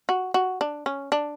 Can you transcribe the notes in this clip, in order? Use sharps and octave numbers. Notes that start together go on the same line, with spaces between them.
F#4
F#4
D4
C#4
D4